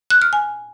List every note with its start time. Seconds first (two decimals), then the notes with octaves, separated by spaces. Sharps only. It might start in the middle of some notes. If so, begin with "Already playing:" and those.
0.10 F#6
0.22 F6
0.33 G#5